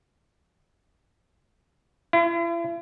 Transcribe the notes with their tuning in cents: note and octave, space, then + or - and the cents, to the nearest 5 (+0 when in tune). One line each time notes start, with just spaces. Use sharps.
E4 +45